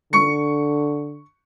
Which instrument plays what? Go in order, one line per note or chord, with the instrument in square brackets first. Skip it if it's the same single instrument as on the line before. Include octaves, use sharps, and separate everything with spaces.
[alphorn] D3 [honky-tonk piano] C#6 C#7